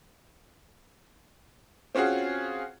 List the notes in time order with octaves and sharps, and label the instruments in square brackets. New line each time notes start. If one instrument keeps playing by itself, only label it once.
[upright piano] C4 C#4 F4 F#4 G#4